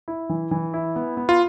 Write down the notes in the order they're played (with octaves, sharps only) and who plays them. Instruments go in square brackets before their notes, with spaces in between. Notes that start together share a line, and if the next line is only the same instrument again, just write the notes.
[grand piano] E4
E3
E3
E4
B3
B3
[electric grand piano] F4